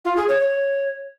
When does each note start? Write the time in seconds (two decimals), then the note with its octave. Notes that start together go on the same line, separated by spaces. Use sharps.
0.05 F4
0.17 G#4
0.29 C#5
0.40 C#5